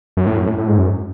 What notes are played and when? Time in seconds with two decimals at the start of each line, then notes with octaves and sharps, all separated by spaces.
0.17 F#2
0.27 A2
0.37 F#2
0.48 A2
0.58 A2
0.68 G#2
0.78 F#2